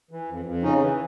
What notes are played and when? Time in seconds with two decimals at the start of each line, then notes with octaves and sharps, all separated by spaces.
0.11 E3
0.29 F2
0.46 F2
0.63 C#3 C#4 D#4
0.82 E3